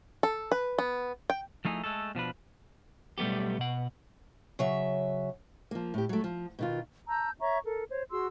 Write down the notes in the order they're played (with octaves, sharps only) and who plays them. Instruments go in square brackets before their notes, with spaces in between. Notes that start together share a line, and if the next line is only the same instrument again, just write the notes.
[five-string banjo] A4
B4
B3
G5
[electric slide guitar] F3 A3 D#4 E4 G#4
G#3 A3 A4
B2 F3 D4 B4
[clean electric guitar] B1 G3 A3 B3 G4
B2 F#5
[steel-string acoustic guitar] C#3 F#3 E5
F3 A#3
A2 G4
F#3 A3
F3
B2 D#3 F4
[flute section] A5 A#5 E6 G6
C#5 E5 A#5 C#6
A4 A#4
C5 C#5
F#4 G#4 C6 E6